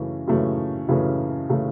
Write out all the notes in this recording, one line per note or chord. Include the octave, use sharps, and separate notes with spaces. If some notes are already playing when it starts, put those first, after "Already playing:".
Already playing: F#2 C#3 E3 A3 C#4
F#2 C#3 E3 A3 C#4
F#2 C#3 E3 A3 C#4
C#3 E3 A3 C#4